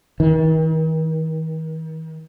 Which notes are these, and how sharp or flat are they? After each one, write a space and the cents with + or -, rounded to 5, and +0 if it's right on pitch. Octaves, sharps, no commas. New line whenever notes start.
D#3 +45